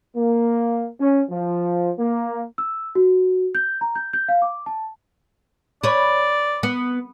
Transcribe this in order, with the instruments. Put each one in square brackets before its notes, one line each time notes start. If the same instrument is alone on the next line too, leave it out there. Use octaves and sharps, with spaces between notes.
[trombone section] A#3
C#4
F3
A#3
[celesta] E6
F#4
G6
A#5
G6
G6
F5
D6
A5
[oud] B4 C#5 [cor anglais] D5
[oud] B3